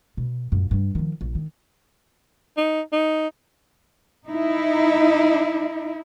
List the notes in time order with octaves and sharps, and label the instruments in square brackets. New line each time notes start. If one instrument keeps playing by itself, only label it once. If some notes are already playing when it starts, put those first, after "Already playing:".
[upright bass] B2
F#2 A#2
G2 G3
D#3 F3
A#1
D#3
[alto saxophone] D#4
D#4
[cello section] D#4 E4